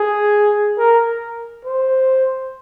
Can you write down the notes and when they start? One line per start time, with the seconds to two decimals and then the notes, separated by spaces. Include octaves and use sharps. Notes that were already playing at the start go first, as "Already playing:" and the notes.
Already playing: G#4
0.78 A#4
1.65 C5